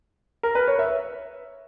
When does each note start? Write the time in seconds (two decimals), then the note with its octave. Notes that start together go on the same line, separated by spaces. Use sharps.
0.43 A#4
0.55 B4
0.68 C#5
0.79 E5